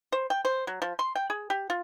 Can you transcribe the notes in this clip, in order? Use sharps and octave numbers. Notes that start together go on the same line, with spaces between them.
C5
G5
C5
F#3
F3
C6
G5
G#4
G4
F4